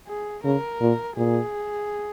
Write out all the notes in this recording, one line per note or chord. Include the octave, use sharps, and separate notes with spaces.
G#4
C#3 A#4
A#2
A#2 G#4